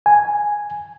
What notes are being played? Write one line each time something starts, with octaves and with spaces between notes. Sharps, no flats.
G#5